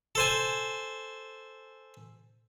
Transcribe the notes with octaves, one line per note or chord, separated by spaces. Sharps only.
A4 C5 G#5